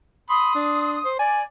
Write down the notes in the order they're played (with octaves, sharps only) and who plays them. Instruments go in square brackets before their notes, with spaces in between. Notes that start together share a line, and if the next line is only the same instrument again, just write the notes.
[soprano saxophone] B5 [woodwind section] C6 D#6
[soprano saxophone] D4
C5
[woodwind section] D5 [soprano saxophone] G#5